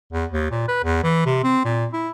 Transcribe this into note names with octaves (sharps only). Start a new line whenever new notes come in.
E2
D#2
A#2
B4
E2
E3
C3
C4
A#2
E4